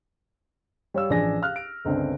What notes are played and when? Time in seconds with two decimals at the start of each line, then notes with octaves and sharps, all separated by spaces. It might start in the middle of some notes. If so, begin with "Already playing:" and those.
0.94 G3 C#5 F5 E6
1.10 A1 F3 D4 G#4 G#5 A#6
1.42 F5 F6 F#6
1.56 D7
1.85 G1 C#2 C4 D4